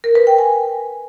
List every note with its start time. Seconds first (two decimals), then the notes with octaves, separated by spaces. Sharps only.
0.04 A#4
0.15 B4
0.27 G5
0.38 G#5